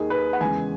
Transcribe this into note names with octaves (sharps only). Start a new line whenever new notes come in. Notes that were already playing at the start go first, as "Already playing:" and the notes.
Already playing: D#2 D#3 A#3 G#4
B4
F#5
E2 C#3 G#3 G#5